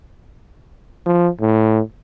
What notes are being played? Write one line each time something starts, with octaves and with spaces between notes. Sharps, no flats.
F3
A2